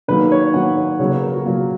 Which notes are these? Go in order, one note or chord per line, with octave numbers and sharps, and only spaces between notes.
D#3 F#3 A#3 B4
C#5
D#3 F#3 A#3 F#5
C#5
C#3 F#3 A#3 C#5
B4
A#4
F#4
C#3 F#3 A#3 F4